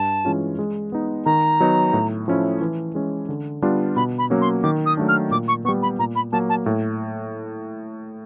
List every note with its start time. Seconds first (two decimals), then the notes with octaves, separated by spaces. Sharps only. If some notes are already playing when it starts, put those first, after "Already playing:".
Already playing: G2 A5
0.25 E3 G#3 C#4 F4
0.59 G#3
0.92 B3 D#4
1.26 D#3 A#5
1.60 F#3 B3 D#4
1.93 A2
2.28 F3 A3 C#4 E4
2.61 E3
2.95 G#3 C#4
3.29 D3
3.62 G3 B3 D4 F4
3.96 B2 B5
4.18 B5
4.30 F#3 A#3 C#4
4.41 C6
4.63 D#3 D6
4.86 D#6
4.97 F#3 A3 D4
5.08 F6
5.31 A#2 D6
5.48 C#6
5.65 B3 C#6
5.68 G3
5.82 B5
5.99 A#2 A#5
6.15 B5
6.32 F#3 A#3 A5
6.49 A5
6.66 A2